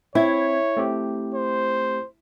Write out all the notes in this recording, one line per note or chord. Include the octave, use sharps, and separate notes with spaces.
C4 E4 C#5 G#6
A3 C4 G4
C5